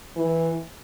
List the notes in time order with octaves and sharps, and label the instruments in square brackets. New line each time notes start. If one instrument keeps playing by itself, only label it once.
[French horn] E3